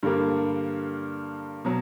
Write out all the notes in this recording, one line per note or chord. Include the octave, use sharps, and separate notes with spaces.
G2 D3 G3 A#3
B2 F#3